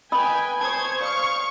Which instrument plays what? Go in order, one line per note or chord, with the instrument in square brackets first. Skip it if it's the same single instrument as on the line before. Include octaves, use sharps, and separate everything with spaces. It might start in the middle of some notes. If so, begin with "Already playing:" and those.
[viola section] B4 G5 G#5 [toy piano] D#5 B5 D#6
[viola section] C5 C#5 [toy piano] A5 D#6 [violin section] G#6
[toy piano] D5 D#6 [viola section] F5 [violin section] C#6